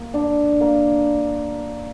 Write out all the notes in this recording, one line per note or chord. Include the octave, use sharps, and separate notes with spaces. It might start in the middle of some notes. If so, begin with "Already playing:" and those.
Already playing: A#3
D4
A#3